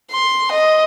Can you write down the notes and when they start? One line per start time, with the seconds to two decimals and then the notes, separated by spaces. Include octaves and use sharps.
0.12 C6
0.51 D#5